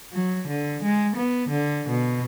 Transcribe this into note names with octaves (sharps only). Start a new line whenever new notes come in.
F#3
D3
G#3
B3
D3
B2